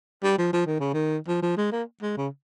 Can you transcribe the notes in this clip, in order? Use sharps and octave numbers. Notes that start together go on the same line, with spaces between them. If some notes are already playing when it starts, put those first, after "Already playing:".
G3
F3
F3
D#3
C#3
D#3
F3
F3
G#3
A#3
G#3
C#3